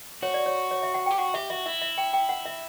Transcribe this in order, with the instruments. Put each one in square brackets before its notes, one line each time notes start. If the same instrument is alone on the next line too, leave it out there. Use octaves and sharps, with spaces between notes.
[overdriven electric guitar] F#4 [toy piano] C#5
[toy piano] D5
C#5
C#5
E5
F#5
[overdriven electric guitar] G4 [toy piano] G5
[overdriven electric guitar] F#4 [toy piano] F#5
[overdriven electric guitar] G4 [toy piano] E5
[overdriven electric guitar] F#4 [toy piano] E5
[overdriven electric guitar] E4 [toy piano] E5
[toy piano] E5
G5
G5
F#5
E5